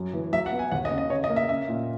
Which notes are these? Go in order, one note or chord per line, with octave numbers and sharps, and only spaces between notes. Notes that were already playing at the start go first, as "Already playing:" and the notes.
Already playing: F#2 F#3
E3
F#3 E5
F#5
B3
G#5
D#2 F#5
D#5
C#3
D#5
C#3 C#5
D#5
A#3
E5
C#4 E5
A#2